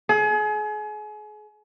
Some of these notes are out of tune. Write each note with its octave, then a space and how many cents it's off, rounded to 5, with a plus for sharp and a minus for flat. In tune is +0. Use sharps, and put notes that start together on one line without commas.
G#4 +35